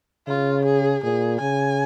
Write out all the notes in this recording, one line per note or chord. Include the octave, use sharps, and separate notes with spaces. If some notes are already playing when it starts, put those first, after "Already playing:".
C#3 F4
G#4
A#2 G#4
C#3 G#5